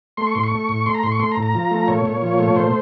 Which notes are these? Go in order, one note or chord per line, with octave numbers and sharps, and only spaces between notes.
A3 C6
C#6
A2 C6
C#6
A3
A2
A3 C6
A#5
A2 C6
C#6
A3 C6
A#5
A2
A#5
F3
A3
A#2 C#5
A#2
F3
A3
A#2 C5